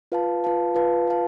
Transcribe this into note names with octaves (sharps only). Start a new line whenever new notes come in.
F4 B4 F5 A5
F4 B4 F5 A5
F4 B4 F5 A5
F4 B4 F5 A5